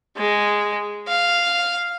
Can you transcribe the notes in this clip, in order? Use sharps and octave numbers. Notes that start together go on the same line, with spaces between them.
G#3
F5